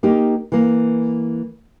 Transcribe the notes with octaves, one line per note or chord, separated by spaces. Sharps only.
A#3 D#4 G4
E3 A#3